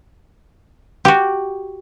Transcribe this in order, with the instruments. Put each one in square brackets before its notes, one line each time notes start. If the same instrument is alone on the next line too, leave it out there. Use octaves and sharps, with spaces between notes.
[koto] F#4 G4